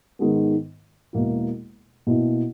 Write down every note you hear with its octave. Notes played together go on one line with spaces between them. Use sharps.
G#2 D#3 G#3 B3
E1 E2 B2 A#3 E4
B2 A#3 E4